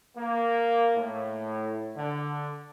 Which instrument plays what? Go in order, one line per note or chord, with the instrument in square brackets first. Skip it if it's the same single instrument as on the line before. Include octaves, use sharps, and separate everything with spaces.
[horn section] A#3
A2
D3